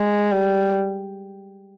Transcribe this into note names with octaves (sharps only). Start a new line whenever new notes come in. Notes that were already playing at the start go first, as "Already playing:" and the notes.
Already playing: G#3
G3